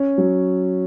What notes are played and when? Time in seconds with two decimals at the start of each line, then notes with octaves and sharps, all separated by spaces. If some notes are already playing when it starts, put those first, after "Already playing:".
Already playing: C#4
0.18 F#3